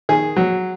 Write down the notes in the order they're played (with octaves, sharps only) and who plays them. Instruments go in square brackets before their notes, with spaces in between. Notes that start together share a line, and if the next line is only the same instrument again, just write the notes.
[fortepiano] D#3 G#4
F#3